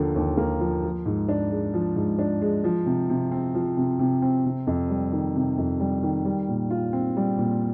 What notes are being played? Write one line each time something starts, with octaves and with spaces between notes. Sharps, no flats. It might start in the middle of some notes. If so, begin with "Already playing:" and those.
Already playing: D#2 D3 F3 A#3
D#2
A#3
F3
F3
G#2
D4
G#3
F3
G#2
D4
G#3
F3
C3
C3
C4
F3
C3
C3
C4
C3
F2
G3
D#3
C3
F2
G3
D#3
G3
A#2
F4
C4
G3
A#2